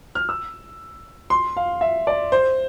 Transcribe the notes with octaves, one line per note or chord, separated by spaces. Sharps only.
F6
E6
C6
F5
E5
D5
C5